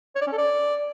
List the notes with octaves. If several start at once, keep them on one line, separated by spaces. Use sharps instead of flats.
C#5
D5
C#4
A4
D5